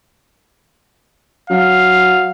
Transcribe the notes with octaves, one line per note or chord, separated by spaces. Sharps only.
F#3 F5